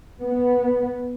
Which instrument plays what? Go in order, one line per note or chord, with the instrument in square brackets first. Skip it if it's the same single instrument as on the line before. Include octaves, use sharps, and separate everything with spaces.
[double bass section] B3